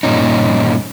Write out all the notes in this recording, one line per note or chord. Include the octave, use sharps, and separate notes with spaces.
G2 A#2 C#4 D#4